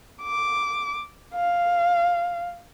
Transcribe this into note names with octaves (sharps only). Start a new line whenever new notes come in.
D6
F5